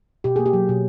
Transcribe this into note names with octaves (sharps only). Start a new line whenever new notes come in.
B2 G4
A#3 G#4
G4
F#3
B2